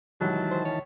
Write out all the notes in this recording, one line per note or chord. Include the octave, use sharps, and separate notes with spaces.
C#2 B2 D#3 E3 F#3 G3 A5
C5
C#5